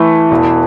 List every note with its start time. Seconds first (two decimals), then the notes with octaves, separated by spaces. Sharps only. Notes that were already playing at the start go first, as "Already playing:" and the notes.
Already playing: E3 A3
0.31 E1